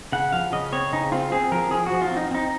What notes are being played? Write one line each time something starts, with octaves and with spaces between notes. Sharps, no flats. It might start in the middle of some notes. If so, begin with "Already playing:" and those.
C#3 F#5
F3 F5
C#3 D#5
C4 C#5
C#3 D#4
C4 F4
C4 G#4
F3 A#4
F3 G#4
F#4
F3
F4
C4
D#4
C4 D#4